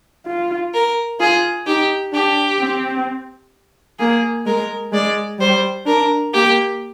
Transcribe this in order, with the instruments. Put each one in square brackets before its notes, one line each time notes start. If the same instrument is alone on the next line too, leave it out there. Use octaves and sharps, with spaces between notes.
[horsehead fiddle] F4
[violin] A#4
[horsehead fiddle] F4 [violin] G#4
[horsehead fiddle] D#4 [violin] G4
[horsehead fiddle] D4 [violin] G4
[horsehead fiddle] C4
[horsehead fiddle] A#3 [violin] G#4
[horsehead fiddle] G#3 [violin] A#4
[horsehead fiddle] G#3 [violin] D5
[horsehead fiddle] G3 [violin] C5
[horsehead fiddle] D4 [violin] A#4
[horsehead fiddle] A#3 [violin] G4